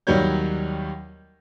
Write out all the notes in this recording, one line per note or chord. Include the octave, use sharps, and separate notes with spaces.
D#2 F#3 G3 D#4 C#5 G6